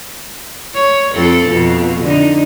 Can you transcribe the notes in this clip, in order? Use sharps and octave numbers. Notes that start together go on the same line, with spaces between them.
C#5
F2 C4 A4
F2 B2
D3 D#4